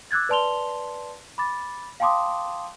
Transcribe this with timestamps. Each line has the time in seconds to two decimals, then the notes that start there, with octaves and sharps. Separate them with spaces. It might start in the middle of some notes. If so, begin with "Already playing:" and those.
0.11 D6 E6 F#6 G#6 A6
0.29 B4 D5 A5 C6 F7 G7
1.38 B5 D6 A6
2.00 F5 G5 A5 C6 D6 D#6